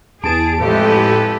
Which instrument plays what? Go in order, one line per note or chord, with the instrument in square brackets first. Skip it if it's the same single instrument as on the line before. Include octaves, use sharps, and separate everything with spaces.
[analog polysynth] E2 A5 D7 [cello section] G#4
[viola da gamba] F2 G#3 [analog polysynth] A2 [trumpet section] E4 A4 B4 [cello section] G4